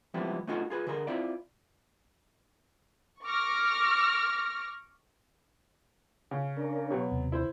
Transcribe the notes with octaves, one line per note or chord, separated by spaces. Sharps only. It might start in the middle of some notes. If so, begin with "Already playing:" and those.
F3 G3 G#3 B3 C4 E4
A3 C#4 D#4 F4 F#4
F4 G#4 B4
D3 G#4 A#4
C4 E4 F4 D5
C#6 D6 F6 A#6
C#3
C#4 D4 A#4
B2 F#3 G4 C#5
D#2 C3
E4 C5